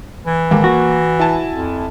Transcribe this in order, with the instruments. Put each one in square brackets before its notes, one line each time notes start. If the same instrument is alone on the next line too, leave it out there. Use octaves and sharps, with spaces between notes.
[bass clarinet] E3
[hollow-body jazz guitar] D#2 G#2 [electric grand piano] A#3
[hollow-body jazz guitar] F#4
[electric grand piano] E4 G#5 A5
[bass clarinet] F2